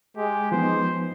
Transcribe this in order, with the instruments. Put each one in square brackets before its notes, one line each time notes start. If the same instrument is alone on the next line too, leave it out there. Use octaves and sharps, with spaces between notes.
[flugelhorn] G#3 [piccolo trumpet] G4
[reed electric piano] F3 B3 D#4 [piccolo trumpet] C5